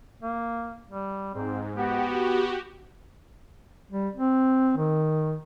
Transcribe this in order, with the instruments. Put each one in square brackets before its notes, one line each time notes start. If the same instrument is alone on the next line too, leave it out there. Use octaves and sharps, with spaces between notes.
[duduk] A#3
G3
[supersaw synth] G#2 [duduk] C4
[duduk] B3 [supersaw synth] F#4 G4
[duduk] G3
C4
D#3